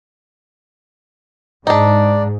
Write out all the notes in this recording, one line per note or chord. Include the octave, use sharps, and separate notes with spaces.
G#2 D4 D#4 D5